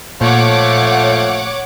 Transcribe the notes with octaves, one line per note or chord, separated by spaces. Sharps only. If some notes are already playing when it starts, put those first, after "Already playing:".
A#2 F3 A3 C#5 F#5 D6